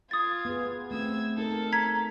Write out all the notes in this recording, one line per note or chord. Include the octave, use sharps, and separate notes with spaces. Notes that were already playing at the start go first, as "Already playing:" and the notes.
F4 D#6 G#6 A6
B3 G#4
A3 C4 E6 G#6
D#4 A4 A#4
A#5 G#6 B6